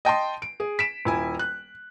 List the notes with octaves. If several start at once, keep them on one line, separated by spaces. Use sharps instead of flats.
D#5 G5 A5 C6
D7
G#4
B6 D7 E7
D#1 E4 G#5
F#6